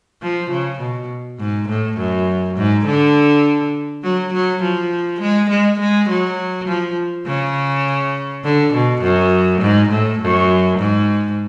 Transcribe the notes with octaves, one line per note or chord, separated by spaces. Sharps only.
F3
C#3
B2
G#2
A2
F#2
G#2
D3
F#3
F#3
F3
G#3
G#3
G#3
F#3
F3
C#3
D3
B2
F#2
G#2
A2
F#2
G#2